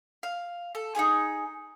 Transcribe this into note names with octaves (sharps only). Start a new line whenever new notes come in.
F5
A4
D#4 G4 G#4 G#5